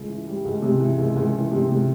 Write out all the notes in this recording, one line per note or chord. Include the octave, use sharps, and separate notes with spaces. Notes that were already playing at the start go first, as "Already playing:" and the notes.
Already playing: C#2
E3
G3
C#2
C3
E3
C#2
C#2
E3
C3
C3